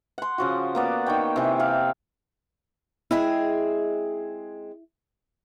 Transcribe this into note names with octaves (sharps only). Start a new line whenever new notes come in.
F#5 C6
C#3 F3 F#4
A#3 B3 D5
D#3 C#5 G5
C3 E3
G4 F5
G#3 C4 E4 G#4